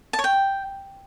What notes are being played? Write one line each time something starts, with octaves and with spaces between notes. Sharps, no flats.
A5
C#5
G5